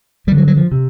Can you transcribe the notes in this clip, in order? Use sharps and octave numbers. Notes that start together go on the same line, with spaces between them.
G2 D3 G3
F#3
F#3
F3
C3